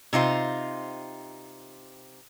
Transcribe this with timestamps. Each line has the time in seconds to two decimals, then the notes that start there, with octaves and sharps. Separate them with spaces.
0.13 C3 D#4 F4 C5